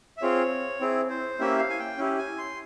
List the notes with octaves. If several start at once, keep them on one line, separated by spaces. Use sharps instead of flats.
E5
C4 F4 G#4 C#5
C4 E4 G#4
C5
A#3 C#4 E4 G4 E5
F5
G#5
G5
C#4 E4 G4
G#5
C6